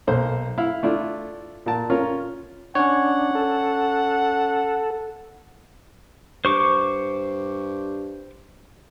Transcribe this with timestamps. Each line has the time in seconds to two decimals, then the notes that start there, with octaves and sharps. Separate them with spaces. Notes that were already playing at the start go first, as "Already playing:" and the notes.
0.07 B1 A#3 C5
0.58 E4 F5
0.83 A3 D4 E4 F4
1.66 A#2 A5
1.90 C#4 F4 A#4
2.75 C#4 D4 C#5 F#5
3.35 A4
6.45 G2 C5 C#6 D6